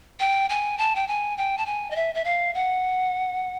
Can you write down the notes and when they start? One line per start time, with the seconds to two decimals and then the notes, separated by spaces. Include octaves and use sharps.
0.20 G5
0.49 G#5
0.78 A5
0.96 G5
1.08 G#5
1.38 G5
1.58 A5
1.66 G#5
1.91 D#5
1.96 E5
2.15 E5
2.25 F5
2.55 F#5